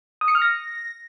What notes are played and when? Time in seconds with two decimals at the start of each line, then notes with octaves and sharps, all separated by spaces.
0.21 D#6
0.28 C#7
0.35 F6
0.42 A#6